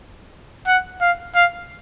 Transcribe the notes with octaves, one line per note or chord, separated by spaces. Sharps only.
F#5
F5
F5